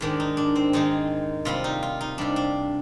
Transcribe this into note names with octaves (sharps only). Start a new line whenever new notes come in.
G#2 D#3 G#3 D4
D#4
D4
C4
G#2 D#3 G#3 D#4
C3 G3 F4
D#4
F4
D#4
C3 G3 D4
D4